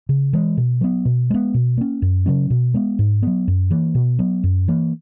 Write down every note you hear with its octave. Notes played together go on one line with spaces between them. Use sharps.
C#3
E3 G#3
B2
F#3 B3
B2
G#3 B3
B2
A#3 C#4
F#2
C#3 F#3 C#4
B2
G#3 B3
G#2
F#3 B3
F#2
E3 A#3
B2
F#3 B3
F#2
E3 A#3